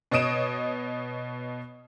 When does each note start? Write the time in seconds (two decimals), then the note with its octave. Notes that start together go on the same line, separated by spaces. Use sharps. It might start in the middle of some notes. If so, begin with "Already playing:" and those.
0.11 B2 C#5 D#5 D#6 D7 E7